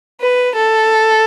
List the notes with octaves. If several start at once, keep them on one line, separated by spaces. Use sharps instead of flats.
B4
A4